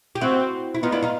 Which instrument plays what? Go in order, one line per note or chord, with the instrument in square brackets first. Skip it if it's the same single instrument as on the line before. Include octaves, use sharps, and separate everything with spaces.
[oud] G4
[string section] C4 [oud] E4 F#4
[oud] E4
[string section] B3 [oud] D#4 F4
[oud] D4 E4
D#4 F4